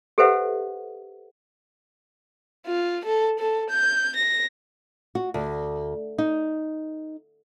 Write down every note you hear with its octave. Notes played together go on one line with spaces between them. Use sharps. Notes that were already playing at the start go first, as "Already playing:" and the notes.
G4 A4 B4 C5 E5 F#5
F4
A4
A4
G6
A#6
F#4
D2
D#4